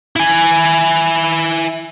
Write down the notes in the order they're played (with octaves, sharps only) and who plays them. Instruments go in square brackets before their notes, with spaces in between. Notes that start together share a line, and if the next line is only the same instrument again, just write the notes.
[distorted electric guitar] E4 G#5